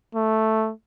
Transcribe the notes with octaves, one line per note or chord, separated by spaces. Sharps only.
A3